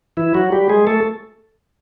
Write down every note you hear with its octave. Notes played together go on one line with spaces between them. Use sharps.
E3 E4
F#3 F#4
G3 G4
G#3 G#4
A3 A4